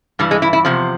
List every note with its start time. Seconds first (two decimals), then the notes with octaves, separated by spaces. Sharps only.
0.19 G2 E3 G3
0.31 G#3
0.42 E4
0.53 E4
0.65 E2 C3 F3